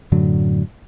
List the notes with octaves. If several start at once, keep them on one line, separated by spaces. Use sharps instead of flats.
F#2 A2 D3 F#3